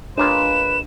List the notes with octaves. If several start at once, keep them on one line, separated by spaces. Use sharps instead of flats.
G#3 A#3 D4 F4 B4 C#5 E7